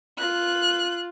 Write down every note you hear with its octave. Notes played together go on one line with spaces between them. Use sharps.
F4 F#6